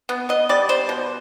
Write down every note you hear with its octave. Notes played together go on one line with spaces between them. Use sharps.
B3
B3 D#5
G3 D5
B3 C5
B2